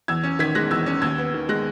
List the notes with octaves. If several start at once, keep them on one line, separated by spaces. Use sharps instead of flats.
E2 E6 G#6
C#4
D#3 G#6 B6
G#3 F#6 A#6
E2 E6 G#6
C#4
D#2 E6 G#6
B3
D#3
G#3 F#6 A#6